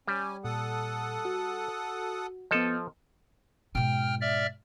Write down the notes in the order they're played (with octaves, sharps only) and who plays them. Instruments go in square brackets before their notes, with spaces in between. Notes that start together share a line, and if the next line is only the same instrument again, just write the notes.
[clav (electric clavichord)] G3 [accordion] C#4 G#5
[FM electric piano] A#2 [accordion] A4 F#5 D#6
[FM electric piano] F#4
[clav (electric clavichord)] F3 A4 [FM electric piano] B3 D#5
[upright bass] G#2 B2 [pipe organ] G5 F6
[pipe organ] D5 E5 F6